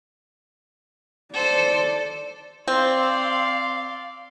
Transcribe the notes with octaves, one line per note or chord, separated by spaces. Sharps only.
A4 C5 D5
C4 D5 F5 C6